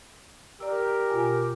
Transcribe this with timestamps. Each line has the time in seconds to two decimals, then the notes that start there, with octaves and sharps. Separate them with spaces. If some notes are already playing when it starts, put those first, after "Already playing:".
0.60 G4 A#4 D5 E6
1.09 B2 F4 G#5